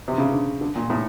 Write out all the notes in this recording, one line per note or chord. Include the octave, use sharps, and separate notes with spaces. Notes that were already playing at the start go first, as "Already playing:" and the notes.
C3
C#3
D3
D3
A#2
A2